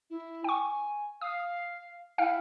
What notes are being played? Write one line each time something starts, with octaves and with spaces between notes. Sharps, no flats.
E4
G5 G#5 C#6
F5 D#6
E4 F5 G5 F6